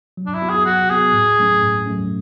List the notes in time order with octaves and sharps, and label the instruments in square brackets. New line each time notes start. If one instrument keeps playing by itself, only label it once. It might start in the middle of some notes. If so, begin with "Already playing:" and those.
[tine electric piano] F#3
[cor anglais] D4
E4
[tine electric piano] B3 F#4
[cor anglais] G#4
[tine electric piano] F#3 [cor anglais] F#4
[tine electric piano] B3 F#4 [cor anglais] G#4
[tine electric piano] A2
F#3 A3 C#4
A2
F#3 A3 C#4